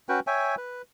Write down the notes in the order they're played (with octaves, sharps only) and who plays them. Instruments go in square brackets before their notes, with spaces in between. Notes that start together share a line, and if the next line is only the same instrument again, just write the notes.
[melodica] C#4 F#4 B4 G5
C#5 E5 G5 G#5
B4